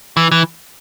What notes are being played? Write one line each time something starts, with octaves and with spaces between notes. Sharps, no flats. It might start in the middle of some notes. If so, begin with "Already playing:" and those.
E3
E3